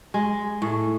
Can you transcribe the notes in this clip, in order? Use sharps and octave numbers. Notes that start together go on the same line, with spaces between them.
G#3
A2